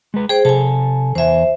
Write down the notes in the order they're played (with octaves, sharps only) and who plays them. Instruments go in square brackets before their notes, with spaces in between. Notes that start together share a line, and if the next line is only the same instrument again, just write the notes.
[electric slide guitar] G#3 B4
[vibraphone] G#4 C5 [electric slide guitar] G5
[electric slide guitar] C3 A4 [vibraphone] G#5 A5
[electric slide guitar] E2 G#5 [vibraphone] C5 E5